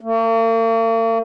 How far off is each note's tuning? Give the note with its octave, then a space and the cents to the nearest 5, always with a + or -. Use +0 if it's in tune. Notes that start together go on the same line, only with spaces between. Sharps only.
A#3 -45